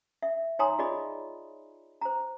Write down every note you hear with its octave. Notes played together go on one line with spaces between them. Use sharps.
E5
D#4 C#5 G#5 A#5 C6 D#6
F4 G#4 D5 D#5 B5
C5 A#5